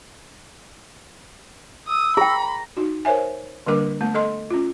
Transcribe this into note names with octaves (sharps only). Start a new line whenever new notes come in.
D#6 E6
G#4 G5 A#5 B5
D#4 F#4
A#4 C5 C#5 E5 G#5
D3 G3 A#3 D4 A#4 D6
A3 B3 A5
A4 D#5 C6
C#4 F4